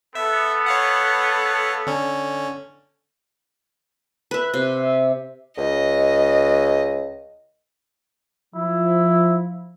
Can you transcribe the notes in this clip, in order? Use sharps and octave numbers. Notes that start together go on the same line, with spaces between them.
B3 A4 E5
C#5 F5 F#5
D3 C#4
B4 E5 F#6
C3
E5
C#2 D#5
F3 E4